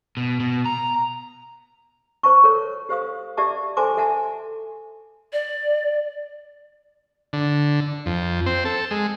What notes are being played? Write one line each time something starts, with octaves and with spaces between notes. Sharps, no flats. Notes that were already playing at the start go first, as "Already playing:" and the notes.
B2
B2
A#5
C5 A5 C#6
A4 A#4 C#5
G4 C5 F5 D#6
G4 D5 E5 A5 D6
A4 C5 G#5 A5 C6 D6
A4 E5 F#5 G#5 A5
D5
D3
F2
C4
A4
G#3